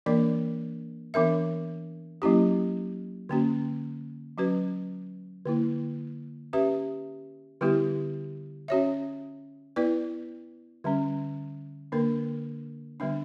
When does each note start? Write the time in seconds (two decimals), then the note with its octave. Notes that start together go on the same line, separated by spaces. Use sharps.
0.06 E3 A#3 D4 A#4 D5
1.14 E3 B3 D4 A#4 E5
2.22 F#3 A#3 C#4 E4 G4
3.29 D3 A#3 C#4 F#4
4.38 F#3 C#4 F#4 B4
5.45 D3 A#3 E4
6.53 C#4 G4 B4 E5
7.61 D3 G3 B3 E4 G4
8.68 C#4 F#4 C#5 E5
9.76 B3 E4 B4 D5
10.84 D3 G3 C#4
11.92 D3 A#3 D4 A#4
13.00 D3 G3 B3 D4